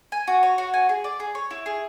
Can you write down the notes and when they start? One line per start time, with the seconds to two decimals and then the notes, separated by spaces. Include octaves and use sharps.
0.12 G#5
0.28 F#4
0.43 C#5
0.58 F#4
0.74 G#5
0.89 G#4
1.04 D5
1.20 G#4
1.35 C#5
1.51 E4
1.66 G#4